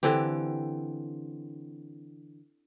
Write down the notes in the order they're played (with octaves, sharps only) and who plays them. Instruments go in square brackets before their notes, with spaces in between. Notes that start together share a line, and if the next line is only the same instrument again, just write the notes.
[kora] D3 E3 C4 G4